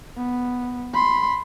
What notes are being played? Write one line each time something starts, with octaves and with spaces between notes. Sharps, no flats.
B3
B5 C6